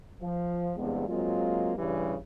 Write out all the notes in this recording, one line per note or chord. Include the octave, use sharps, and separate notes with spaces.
F3
E2 G2 C3 G#3 B3
F#3 G#3 A#3 C4 F4
G2 C#3 E3 G3